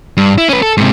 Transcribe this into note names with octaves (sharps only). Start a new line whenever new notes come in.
G2
E4
C#4 B4
A4
G#2 C3